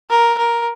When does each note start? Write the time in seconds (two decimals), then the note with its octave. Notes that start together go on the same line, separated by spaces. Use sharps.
0.10 A#4
0.39 A#4